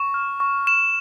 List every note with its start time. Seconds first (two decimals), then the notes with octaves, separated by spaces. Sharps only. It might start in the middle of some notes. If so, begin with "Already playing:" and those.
Already playing: C#6
0.14 F6
0.40 C#6
0.67 F6 E7